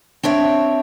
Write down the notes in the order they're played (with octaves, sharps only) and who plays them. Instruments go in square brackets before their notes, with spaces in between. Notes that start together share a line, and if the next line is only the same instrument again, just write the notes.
[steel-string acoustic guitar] C4 D4 C#5 E5